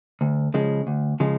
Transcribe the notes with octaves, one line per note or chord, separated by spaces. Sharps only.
D2
C#3 F3 G#3
D2
C#3 F3 G#3